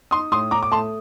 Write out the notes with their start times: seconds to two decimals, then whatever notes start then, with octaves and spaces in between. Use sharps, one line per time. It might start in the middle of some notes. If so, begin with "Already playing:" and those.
0.11 D#4 C6 D#6
0.32 A2 C6 D#6
0.51 A2 A#5 D6
0.63 D6
0.72 A3 A5 C6